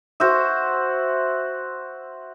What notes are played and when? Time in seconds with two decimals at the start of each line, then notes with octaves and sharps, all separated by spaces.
0.20 F#4 C5 E5